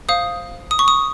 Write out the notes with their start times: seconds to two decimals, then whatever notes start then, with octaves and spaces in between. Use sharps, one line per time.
0.09 C5 F5 D#6
0.71 D#6
0.79 C#6
0.88 D#6